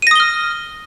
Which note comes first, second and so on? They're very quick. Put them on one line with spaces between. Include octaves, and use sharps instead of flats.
D#7 A#6 D#6 G7 F6